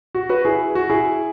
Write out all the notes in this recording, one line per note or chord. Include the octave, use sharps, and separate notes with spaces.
F#4
F#4 B4
E4 G#4
F#4
E4 G#4